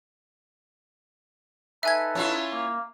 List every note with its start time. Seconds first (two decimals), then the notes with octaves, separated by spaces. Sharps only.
1.83 D#4 A4 B4 E5 G#5 G#6
2.15 C#4 E4 F4
2.51 A#3